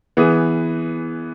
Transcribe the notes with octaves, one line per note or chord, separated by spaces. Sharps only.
E3 B3 G#4